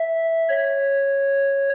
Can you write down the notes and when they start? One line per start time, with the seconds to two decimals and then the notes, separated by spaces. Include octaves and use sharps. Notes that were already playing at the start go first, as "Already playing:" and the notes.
Already playing: E5
0.49 C#5